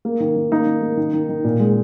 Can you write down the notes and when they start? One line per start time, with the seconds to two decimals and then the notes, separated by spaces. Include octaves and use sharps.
0.05 A#3
0.20 D#3
0.36 D#3
0.51 A#3 D#4
0.66 D#3
0.82 A#3
0.97 D#3
1.13 D#3
1.29 D#3
1.44 A#2
1.60 G#3